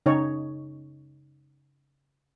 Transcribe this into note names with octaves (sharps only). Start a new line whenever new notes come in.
C#3 D#4 C#5